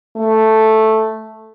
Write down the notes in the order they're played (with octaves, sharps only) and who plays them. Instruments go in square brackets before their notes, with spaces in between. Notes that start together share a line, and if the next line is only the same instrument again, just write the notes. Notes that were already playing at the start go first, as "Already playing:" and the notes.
[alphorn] A3